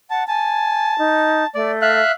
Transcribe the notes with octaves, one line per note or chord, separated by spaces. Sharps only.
F#5 A5
G#5 A5
D#4
A3 D5
E5 F5 F#6